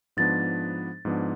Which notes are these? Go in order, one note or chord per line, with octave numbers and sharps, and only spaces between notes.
G#2 F3 B3 D4 A6
G#2 F3 B3 D4